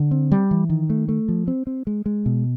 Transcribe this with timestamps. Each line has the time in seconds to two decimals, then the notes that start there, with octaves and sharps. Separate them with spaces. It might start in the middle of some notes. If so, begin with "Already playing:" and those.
Already playing: D3
0.11 C4
0.32 G3
0.51 E3
0.69 D#3
0.90 A3
1.09 A3
1.29 F3
1.48 C4
1.67 C4
1.87 G#3
2.06 G#3
2.26 B2